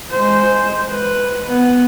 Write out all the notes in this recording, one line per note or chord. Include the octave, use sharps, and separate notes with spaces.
G#3 C5
B4
B3